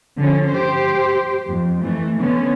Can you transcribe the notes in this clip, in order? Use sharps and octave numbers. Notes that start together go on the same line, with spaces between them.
D3 F3 C#4
G4 C5
F2
E3 A3
D3 B3 C#4